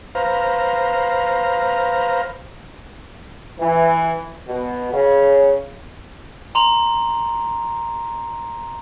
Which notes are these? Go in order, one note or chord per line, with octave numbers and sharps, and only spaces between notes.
B4 C5 F5 A#5
E3
B2
C#3
A#5 C6 F7